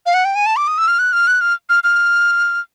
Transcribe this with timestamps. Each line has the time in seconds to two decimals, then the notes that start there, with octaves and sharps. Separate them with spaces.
0.06 F5
0.14 F#5
0.25 G5
0.35 G#5
0.46 A5
0.56 D6
0.68 D#6
0.78 E6
0.88 F6
0.99 F#6
1.13 F6
1.27 F#6
1.41 F6
1.69 F6
1.84 F6